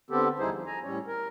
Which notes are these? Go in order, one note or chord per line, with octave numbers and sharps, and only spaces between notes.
D3 B3 C4 G4 A4
E2 G3 D#4 E4 G#4 C5
F3
G#5 A#5
A2 G3 C#4 C#5
A#4